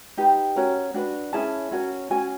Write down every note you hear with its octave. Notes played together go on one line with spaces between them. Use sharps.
D#4 G4 B4
C#4 F#4 A#4
D4 F#4 B4
C#4 E4 G#4 A5
C#4 F#4 A#4
C#4 F#4 G#5